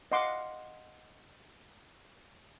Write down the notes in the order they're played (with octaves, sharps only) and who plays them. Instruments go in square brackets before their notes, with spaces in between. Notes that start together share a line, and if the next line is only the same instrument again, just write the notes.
[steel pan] D#5 F5 F#5 C6 D6